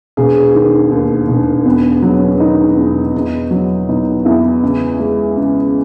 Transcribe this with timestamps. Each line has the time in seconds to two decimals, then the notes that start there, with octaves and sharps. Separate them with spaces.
0.17 E1 G#4
0.55 D#3
0.92 D#2
1.28 E1
1.66 E2 B3
2.02 F#3
2.15 C#4
2.40 D#3 D#4
2.77 E2
3.15 E2
3.51 F#3
3.89 B2 D#4
4.25 E2 E4
4.63 C#2
4.99 G#3
5.37 C#3